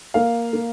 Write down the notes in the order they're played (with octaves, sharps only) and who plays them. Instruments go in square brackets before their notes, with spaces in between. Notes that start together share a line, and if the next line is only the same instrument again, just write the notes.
[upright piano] A#3 [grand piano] F5
[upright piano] A#3